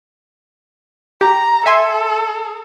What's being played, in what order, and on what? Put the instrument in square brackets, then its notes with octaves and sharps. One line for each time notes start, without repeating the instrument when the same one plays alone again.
[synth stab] G4 [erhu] A#5
[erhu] A4 [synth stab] E5 G#5 C6